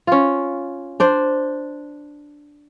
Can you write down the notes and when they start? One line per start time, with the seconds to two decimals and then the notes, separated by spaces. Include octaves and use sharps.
0.07 C#4 F4
1.00 D4 C5 D5